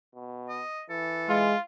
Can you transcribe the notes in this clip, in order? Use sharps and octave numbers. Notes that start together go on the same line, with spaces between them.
B2
D#5
E3 A4
G#3 F4